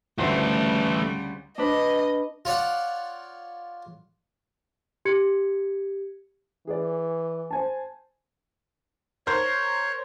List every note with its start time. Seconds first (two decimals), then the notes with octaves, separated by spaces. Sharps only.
0.18 D2 C#3 E3 G3 A3 C5
1.58 D4 B4 D#5
2.45 F4 C#5 D5 F#5
5.05 G4 G#6 C#7
6.67 E3 G#4 D5
7.51 C5 G#5 A5
9.27 A#4 C5 C#5